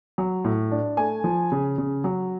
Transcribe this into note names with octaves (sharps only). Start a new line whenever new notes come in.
F#3
A2
D4
A3 G#5
F3
C#3
C#3
F#3